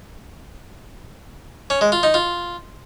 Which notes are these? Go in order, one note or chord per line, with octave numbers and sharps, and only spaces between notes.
C#4
G#3
F4
D#4
F4